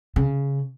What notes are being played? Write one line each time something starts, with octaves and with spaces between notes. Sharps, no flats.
C#3